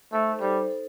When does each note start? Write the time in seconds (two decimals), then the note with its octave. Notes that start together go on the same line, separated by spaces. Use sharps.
0.12 A3 D#4 A4 C5
0.41 G3 D#4 A4 C5
0.69 D#4 A4 C5